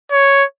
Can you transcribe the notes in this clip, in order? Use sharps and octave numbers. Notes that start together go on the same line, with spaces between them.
C#5